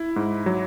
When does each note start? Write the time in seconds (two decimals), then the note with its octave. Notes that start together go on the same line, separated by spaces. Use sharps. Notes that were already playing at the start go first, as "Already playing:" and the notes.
Already playing: E4
0.16 G#2
0.46 F#3